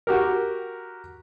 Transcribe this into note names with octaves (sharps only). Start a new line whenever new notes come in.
F#4 G4 A#4